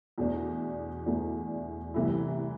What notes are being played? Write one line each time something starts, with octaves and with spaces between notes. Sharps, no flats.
E2 B2 A3 D4
E2 B2 A3 D4
C2 C3 E3 A3 E4